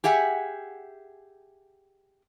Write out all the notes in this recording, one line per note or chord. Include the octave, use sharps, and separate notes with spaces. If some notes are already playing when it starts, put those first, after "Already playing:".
G4 G#4 E5 F#5 G#5